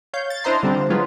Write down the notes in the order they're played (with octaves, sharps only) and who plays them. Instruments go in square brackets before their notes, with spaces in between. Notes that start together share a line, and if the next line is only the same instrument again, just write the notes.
[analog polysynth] C#5 F5 G6
A6
D4 E4 C5 D#5 A#5 C6
D3 G3 C4 D4
F3
F#3 G#3 F4 G#4 B4